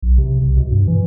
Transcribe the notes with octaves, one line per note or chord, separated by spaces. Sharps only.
B1
C3
C2
B2
G2
E3